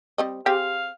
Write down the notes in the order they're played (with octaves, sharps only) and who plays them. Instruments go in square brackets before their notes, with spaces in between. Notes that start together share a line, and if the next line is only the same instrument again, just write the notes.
[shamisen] G3 C4 D#5
[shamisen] C4 G#4 [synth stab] G4 [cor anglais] F5